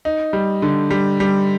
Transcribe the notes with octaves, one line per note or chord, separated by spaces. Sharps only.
D#4
G3
D3
G3
G3